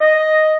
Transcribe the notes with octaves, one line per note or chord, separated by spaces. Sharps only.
D#5